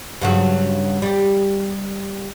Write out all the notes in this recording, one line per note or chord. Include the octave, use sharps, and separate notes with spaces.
G2 C#3 F#3
G3 G4